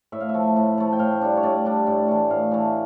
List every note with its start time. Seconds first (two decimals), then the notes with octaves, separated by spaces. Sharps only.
0.12 A2 E5
0.20 F5
0.29 E5
0.34 F3 A3
0.56 A2
0.78 F3 A3
0.93 G5
0.99 A2 F5
1.21 G3 D4
1.37 C#5
1.43 A2 D5
1.65 G3 D4
1.87 A2
2.08 E3 A3
2.30 A2 F5
2.51 E3 A3